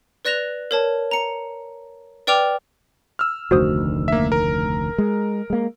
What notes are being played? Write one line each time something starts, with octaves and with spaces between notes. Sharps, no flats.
B4 D5 F#6 A#6 E7 F7
A#4 C#5 A5
A#5 C#7
B4 D5 G5 D6 F6 F7
E6 F6
F1 D2 D#3 F#4 C5 D#6
A#3 E5
A#4
G#3
G#3 A#3